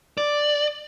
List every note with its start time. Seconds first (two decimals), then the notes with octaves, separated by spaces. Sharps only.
0.18 D5